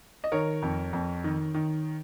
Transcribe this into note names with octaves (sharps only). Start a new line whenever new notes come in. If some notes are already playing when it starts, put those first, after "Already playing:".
D#5
D#3 A#4 C#5
F2
F2
D#3
D#3